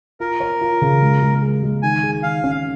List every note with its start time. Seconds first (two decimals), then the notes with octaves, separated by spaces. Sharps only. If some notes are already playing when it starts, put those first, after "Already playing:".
0.20 F4 A#4
0.40 C#5
0.61 F4
0.82 C#3
1.02 G#3
1.22 G#3
1.42 G#4
1.63 G#3
1.82 D#3 G#5
2.03 G#4
2.23 D#3 F5
2.44 C#4